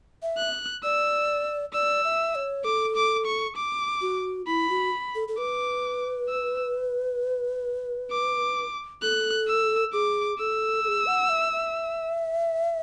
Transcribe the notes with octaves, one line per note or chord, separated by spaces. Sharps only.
E5
F#6
D5 E6
D5 E6
E5
C#5
A4 D6
D6
C#6
D6
F#4
E4 B5
F#4
A4
A4
B4 D6
E6
D6
A4 F#6
E6
G#4 D6
A4 E6
A4
G#4
F#5
E5
E5